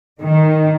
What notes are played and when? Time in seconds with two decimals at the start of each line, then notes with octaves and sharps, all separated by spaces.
0.20 D#3